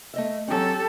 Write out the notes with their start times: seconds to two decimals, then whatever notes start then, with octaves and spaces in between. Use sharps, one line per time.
0.14 A3 D#5 E5
0.48 F#3 C4 C#4 G4 A4